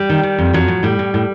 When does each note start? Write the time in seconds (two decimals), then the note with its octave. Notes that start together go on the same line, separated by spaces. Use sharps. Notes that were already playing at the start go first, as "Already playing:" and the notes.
Already playing: G3
0.09 D#3
0.23 D#3
0.38 F2
0.53 F3 F#3
0.68 A2
0.83 A2 G3
0.99 A2
1.14 A2